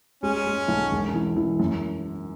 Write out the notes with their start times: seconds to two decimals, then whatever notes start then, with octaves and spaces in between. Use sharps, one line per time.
0.23 G#3 C#4
0.46 G#3
0.68 B1
0.91 E1
1.14 E3
1.37 E3
1.60 F#2